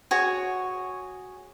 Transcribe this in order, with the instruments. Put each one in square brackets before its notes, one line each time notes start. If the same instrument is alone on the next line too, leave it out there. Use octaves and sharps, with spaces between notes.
[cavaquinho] F#4 G#4 C#5